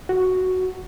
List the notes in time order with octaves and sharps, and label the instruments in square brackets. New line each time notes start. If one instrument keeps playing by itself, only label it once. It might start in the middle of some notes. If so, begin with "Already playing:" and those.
[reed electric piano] F#4